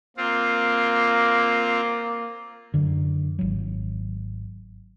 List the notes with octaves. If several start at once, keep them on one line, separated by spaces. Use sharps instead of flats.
A#3 C4 F4
F#2 D3
G#1 F#3